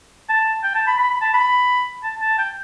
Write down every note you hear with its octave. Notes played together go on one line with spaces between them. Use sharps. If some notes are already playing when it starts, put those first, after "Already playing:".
A5
G5
A5
B5
B5
B5
A5
B5
A5
A5
G5